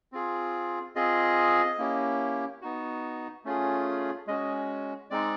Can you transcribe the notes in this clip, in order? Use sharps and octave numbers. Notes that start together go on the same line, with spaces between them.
C4 F4 G#4
C4 F4 G#4 D#5
A#3 C#4 E4 G4
B3 D#4 F#4
A3 C#4 F4 G#4
G#3 C#4 F#4 D#5
G#3 C4 D#4 D5